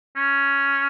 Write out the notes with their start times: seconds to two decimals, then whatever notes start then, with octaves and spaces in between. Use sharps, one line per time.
0.16 C#4